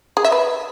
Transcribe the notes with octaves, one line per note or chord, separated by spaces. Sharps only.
G#4
E5
B4